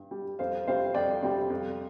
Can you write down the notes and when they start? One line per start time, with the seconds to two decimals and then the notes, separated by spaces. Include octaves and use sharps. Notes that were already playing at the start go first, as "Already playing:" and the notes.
Already playing: G2
0.11 G3
0.39 F2 C5 F5
0.67 C3 G3 C5 F5
0.94 F2 D5 G5
1.22 C3 G3
1.50 F2